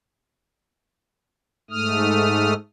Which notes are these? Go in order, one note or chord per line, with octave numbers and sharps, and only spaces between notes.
G#2 A3 D#6 F6